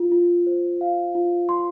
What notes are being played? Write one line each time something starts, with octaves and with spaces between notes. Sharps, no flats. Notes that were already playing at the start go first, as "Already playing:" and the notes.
Already playing: F4
F4
C5
F5
F4
C6